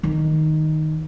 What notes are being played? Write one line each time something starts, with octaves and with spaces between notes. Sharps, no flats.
D#3